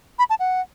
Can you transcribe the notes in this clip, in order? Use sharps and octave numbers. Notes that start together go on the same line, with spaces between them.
B5
A5
F#5